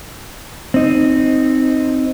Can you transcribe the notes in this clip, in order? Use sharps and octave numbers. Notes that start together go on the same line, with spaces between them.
C4 D#4